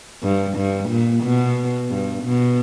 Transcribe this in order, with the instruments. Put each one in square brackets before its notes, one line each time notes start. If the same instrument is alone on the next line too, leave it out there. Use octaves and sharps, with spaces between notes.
[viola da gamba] G2
G2
A#2
B2
G2
B2